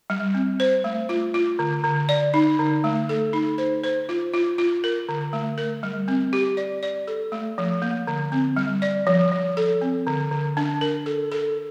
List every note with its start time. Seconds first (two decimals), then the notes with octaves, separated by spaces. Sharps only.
0.10 G3
0.34 C4
0.60 C5
0.84 A3
1.09 F4
1.34 F4
1.59 D3
1.84 D3
2.09 D5
2.34 D#4
2.59 D3
2.84 A3
3.09 A4
3.33 D#4
3.58 C5
3.84 C5
4.09 F4
4.33 F4
4.58 F4
4.84 A#4
5.09 D3
5.33 A3
5.58 A#4
5.83 G3
6.08 C4
6.33 G4
6.57 D5
6.83 D5
7.07 A4
7.32 A3
7.58 F3
7.82 A#3
8.07 D3
8.32 C4
8.57 G3
8.82 D5
9.07 F3
9.32 F3
9.57 A4
9.81 C4
10.07 D3
10.31 D3
10.57 D4
10.81 A#4
11.06 A4
11.32 A4